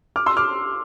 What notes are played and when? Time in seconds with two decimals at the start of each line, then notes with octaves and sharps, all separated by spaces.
0.16 D6 F6
0.26 C6 E6
0.37 D6 F6